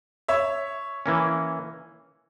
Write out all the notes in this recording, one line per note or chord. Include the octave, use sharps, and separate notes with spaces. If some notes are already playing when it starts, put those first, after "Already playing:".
C#5 E5
E3 A#3 C#4